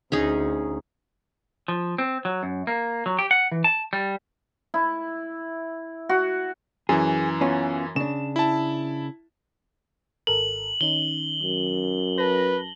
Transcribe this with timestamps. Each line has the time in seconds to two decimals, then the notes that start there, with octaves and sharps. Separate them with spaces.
0.12 D2 C#4 D#4 G#4
1.68 F3
1.98 C4
2.25 F#3
2.43 F#2
2.67 A#3
3.06 F#3
3.19 G4
3.31 F#5
3.52 E3
3.64 A5
3.93 G3
4.74 E4
6.09 F#4
6.89 F#2 E3 G#4
7.41 B3 C#4 F4
7.96 C#3 D4 E7
8.36 E4 A5
10.27 G#1 A4 A#4 F#7
10.81 D#3 C#4 D#4 G7
11.43 F#2
12.18 B4 A5 A#6